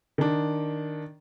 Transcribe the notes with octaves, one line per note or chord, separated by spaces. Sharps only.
D#3 D4